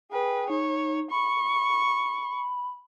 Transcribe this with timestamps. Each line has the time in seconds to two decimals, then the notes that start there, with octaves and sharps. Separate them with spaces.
0.12 G#4 B4 G5
0.50 D#4 C#5
1.11 B5 C#6